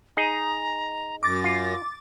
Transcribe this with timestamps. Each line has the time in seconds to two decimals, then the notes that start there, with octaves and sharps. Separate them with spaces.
0.17 D#4 G#4 D#5 A#5
1.23 F#2 D6 A6 A#6
1.44 F4